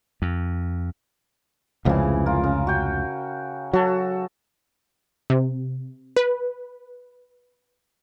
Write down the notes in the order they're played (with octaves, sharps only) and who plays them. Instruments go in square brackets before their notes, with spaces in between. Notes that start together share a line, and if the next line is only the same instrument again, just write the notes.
[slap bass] F2
[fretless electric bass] F1 C#2 F3 [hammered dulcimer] C#3 E3
[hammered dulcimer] F4 A#4
C#3
F#4 G5
[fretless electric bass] F#3 [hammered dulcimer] F#4 A4
[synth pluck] C3
B4